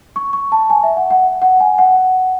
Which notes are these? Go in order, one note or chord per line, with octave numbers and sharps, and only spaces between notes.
C#6
C#6
A5
G#5
E5
F#5
F#5
F#5
G#5
F#5